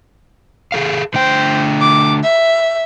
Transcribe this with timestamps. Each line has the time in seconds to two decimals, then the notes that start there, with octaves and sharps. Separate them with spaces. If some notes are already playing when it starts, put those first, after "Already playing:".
0.72 G#4 A4 F5
1.14 D3 A3 C5 G5
1.81 D6
2.24 E5